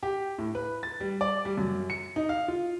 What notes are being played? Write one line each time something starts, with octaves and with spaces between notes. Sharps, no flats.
G4
A2
B4
A6
G3
D5
G3
F#2
C#7
D#4
F5
F4